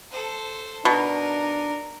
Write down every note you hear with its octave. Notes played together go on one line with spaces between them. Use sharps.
A4 C5
B2 D4 D#4 A#4